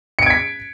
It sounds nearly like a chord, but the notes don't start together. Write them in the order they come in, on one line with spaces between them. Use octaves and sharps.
C#7 D7 G#6 B6